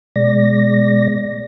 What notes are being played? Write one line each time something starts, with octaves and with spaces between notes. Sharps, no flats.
B2 G#3 D5 A#6